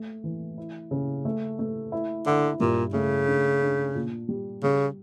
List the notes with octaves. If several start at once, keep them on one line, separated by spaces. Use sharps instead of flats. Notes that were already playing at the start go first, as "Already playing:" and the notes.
Already playing: A3
E3
E4
C#3
A3
A3
E4
D3 E4
G2 A#2
C#3 A3
D4
D4
A#2
G3
C#3 G3